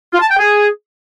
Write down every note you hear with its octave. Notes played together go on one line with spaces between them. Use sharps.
F4
A5
G5
G#4